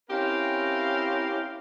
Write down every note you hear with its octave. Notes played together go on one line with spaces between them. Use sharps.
C4 C#4 E4 G4 A#4 F5